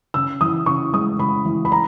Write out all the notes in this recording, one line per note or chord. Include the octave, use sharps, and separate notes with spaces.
C#3 E6
E3 D#6
C#3 C#6
G#3 D#6
C#3 B5
E3
B5
A#5